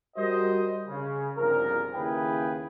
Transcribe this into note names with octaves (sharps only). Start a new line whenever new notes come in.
G3 F#4 A#4 C5 D#5
C#3
G1 C2 C#3 F3 A#4
D#2 C#3 E4 G#4 B4 G5